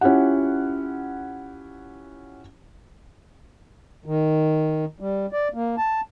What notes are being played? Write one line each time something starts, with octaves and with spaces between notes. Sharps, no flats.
C#4 E4 F4 G4 F#5
D#3
G3
D5
A#3
A5